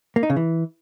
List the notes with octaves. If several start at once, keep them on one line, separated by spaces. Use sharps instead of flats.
A#3
D#4
C#3
E3